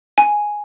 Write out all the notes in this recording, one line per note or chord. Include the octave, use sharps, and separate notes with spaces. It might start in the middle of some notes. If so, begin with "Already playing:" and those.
G#5